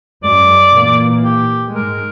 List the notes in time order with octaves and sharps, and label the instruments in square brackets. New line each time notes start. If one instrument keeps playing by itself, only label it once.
[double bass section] F#2 G#3 [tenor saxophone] D5
[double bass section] A#2 E3 A#3
[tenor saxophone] G4
[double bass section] G#2 G#3 [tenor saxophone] A#4